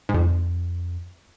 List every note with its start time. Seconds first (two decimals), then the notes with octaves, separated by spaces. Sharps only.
0.09 G#2
0.14 F2